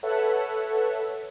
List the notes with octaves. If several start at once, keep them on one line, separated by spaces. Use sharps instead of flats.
A4 B4 C#5 E5 F#5